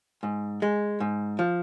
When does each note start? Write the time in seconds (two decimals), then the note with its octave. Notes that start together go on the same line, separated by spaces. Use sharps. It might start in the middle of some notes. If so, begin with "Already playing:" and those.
0.23 G#2
0.62 G#3
1.00 G#2
1.39 F3